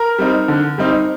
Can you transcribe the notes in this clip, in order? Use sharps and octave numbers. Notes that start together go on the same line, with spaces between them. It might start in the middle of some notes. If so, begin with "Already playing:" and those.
Already playing: A#4 A#5
G3 C4 D#4
D3
G3 C4 D#4